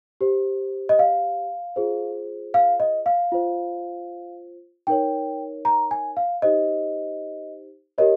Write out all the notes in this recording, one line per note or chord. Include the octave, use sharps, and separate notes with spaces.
G4 C5
D#5
F5
F4 G#4 C5
F5
D#5
F5
F4 C5
D#4 A#4 C#5 G5
A#5
G#5
F5
D#4 G4 C5 D#5
G4 A#4 C#5 D#5